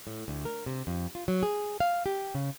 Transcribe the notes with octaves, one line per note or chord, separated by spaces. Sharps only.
A2
D2
A#4
C3
F2
F4
F#3
G#4
F5
G4
C#3